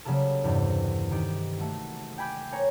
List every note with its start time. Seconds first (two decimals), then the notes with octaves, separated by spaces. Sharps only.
0.05 C#3 F#3 G3 A#3 A4
0.44 E2 G2 C3
1.11 D#3 G4
1.58 A3 F#4
2.18 G5 G#5 B5 D6 G6
2.52 A#4 C#5 G#5